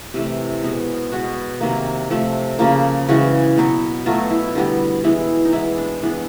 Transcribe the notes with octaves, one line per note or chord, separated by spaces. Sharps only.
C3 E3 A3 G4
B2 G#3 B3
B2 G#3 B3 F#4
C3 D#3 F#3 A#3
C3 F3 A3
C#3 F3 A#3
C#3 E3 G#3 F#4
B2 F#3 B3
B2 F#3 A3 F4
E4
D3 G3 B3
E3 G#3 B3 E4
D#4
E3 G#3 B3 E4
D4
E3 G#3 B3 D4